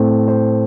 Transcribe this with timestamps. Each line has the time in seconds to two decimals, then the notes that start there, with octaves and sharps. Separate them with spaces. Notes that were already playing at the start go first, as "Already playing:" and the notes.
Already playing: A2 A3 C4
0.28 C5